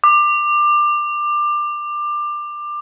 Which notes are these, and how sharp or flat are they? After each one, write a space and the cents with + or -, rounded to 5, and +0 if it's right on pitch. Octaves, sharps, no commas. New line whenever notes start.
D6 +20